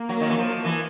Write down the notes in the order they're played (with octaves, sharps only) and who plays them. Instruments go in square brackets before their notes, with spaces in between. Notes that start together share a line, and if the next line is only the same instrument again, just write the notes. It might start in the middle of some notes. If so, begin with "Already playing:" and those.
Already playing: [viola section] A#3
[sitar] F#3
D#3
E3
F3
E3